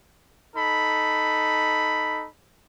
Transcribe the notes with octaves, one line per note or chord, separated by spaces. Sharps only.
D#4 A4 B5